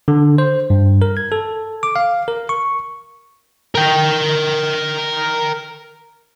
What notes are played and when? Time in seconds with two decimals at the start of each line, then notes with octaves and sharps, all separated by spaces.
0.08 D3
0.38 C5
0.70 G2
1.02 A#4
1.17 G#6
1.32 A4
1.83 D6
1.96 F5
2.28 A#4
2.49 C#6
3.75 A#4 G5